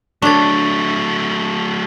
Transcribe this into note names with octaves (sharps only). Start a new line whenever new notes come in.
F#3 A3 D4 C#5 C#6 A6